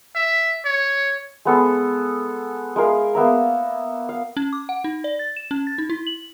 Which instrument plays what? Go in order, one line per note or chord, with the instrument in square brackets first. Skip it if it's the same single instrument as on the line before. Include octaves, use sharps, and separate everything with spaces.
[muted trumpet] E5
C#5
[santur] G#3 B3 A4
G#3 E4 A#4 F5
A#3 B3 E5 A#5
F5
[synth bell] C#4
D6
F#5
D#4
D5
A6
E7
C#4
A6
D#4
E4
F#7